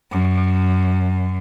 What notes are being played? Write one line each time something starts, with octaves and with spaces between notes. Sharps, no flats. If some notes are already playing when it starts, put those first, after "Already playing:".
F#2